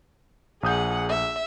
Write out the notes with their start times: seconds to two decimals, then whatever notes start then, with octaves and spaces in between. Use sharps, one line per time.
0.63 A#1 G#4 F#5 D#6 G6
1.09 E5